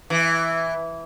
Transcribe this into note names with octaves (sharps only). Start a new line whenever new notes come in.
E3